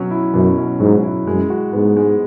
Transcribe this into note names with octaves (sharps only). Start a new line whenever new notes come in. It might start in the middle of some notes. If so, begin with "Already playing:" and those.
Already playing: B2 F#3 C#4
E4
F#2 B2
C#4
G#2 F#3
E4
F#2 G#3
F#4
G#2 B3
G#3